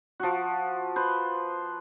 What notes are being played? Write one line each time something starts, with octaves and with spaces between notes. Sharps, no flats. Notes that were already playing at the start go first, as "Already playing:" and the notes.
F3 F#4
B4 C5